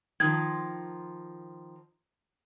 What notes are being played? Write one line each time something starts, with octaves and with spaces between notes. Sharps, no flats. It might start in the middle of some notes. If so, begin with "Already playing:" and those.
D#3 F3 G#6